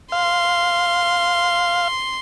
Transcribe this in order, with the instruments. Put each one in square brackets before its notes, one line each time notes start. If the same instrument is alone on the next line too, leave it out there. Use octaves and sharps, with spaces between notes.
[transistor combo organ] F5 [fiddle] C6